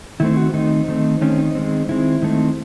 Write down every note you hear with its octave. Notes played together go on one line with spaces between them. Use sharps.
D#3 A3 C4 E4
F#4
D#3 A3 C4 D#4
D#3 A3 C4
D#3 A3 C4 C#4
D#4
D#3 G#3 C4
D#3 G#3 C4 E4
D#3 A3 C4